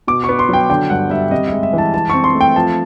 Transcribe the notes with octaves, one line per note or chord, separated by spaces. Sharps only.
B2 D6
C#6
B3
C6
F#3 G5
D3 G5
G2 F#5
G3 E5
C3 D#5
G#3 E5
E5
E3
A5
E3 A5
C4 C#6
C6
A3
G5
F3 A5